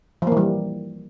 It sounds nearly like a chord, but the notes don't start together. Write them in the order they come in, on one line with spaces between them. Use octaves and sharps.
F3 A#3 E3 G3